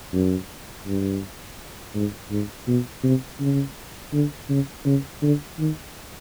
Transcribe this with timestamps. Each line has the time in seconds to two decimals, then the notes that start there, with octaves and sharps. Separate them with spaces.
0.13 F#2
0.86 G2
1.95 G#2
2.31 G#2
2.68 B2
3.03 C3
3.40 C#3
4.13 D3
4.49 C#3
4.85 C#3
5.22 D3
5.58 D#3